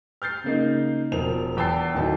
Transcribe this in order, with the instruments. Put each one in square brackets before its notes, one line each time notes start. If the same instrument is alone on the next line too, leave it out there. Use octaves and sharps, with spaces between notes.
[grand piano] F6 G6 A6 C7
C#3 A#3 D#4
E1 F3 A#4 F7
E2 G5 A5 E6 A6 C7
D1 D#3 A5